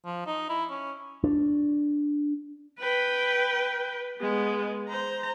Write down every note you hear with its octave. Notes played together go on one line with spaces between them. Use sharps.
F3
D#4
E4
C#4
D4
B4 G5
G#3 B3
C5 A#5